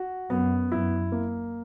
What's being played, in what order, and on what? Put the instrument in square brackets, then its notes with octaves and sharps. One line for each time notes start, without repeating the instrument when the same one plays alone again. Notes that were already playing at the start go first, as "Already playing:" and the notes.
Already playing: [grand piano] F#4
[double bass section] F#2 [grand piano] B3
[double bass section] F#2 [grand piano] E4
[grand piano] A#3